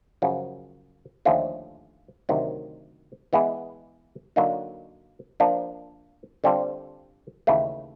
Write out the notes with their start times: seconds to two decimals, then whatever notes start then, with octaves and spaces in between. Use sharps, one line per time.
0.22 F#2 C#3 F3
1.25 D#2 D3 F3 A3 C#4
2.29 D2 C3 D#3 F#3
3.33 E3 G#3 B3 E4 G#4
4.36 D3 F#3 A#3 D#4
5.40 F3 A#3 D4
6.44 D3 G3 C4 F4 A4
7.47 D#2 C#3 E3 A3